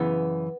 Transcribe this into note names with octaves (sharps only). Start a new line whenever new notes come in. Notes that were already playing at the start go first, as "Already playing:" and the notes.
Already playing: F#2 C#3 E3 B3